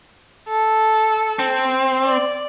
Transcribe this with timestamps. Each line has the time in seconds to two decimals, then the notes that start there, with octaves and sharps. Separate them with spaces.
0.48 A4
1.39 C4
2.04 D5